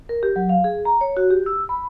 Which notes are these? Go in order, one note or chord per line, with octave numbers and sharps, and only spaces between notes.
A#4
G4
F#3
F5
G#4
A#5
C#5
F#4
G4
E6
B5